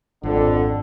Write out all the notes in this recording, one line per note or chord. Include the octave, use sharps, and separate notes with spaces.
G#1 F2 D3 D4